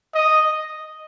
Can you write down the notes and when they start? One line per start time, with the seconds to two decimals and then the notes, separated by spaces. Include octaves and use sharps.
0.15 D#5